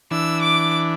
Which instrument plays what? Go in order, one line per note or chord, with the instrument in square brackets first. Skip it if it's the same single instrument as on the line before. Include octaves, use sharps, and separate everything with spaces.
[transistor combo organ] E3 D4 [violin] E6
[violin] D6